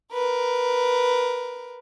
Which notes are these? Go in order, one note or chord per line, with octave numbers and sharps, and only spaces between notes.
A#4 B4